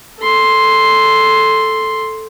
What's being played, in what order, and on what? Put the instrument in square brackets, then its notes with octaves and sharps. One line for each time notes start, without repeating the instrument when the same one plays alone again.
[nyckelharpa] A4 C6